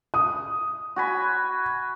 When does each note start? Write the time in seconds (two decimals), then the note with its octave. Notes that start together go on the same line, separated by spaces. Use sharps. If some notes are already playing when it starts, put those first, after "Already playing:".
0.14 D#6
0.96 F#4 G#5 B5